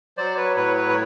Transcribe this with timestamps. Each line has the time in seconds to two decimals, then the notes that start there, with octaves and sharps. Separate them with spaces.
0.17 F#3 C5 D5
0.37 B4 C#5
0.56 A2 B4 C#5
0.77 B4 C#5
0.89 C#5